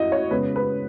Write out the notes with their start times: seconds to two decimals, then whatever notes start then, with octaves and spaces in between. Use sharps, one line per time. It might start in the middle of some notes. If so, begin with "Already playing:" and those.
Already playing: E4 F#4 D#5
0.12 C#5
0.31 C#3 G#3 B3 B4
0.56 B4